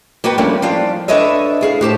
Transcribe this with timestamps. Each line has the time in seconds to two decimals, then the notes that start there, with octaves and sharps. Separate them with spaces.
0.24 A#3 B3 F#4 B4 G5
0.38 F3 G3 A3 A#3 C#4 D4
0.62 F3 G3 D4 F4 D5
1.08 D4 A4 B4 C#5 D#5 E5
1.61 E4 G#4 F5
1.81 A2 G4 C5 A5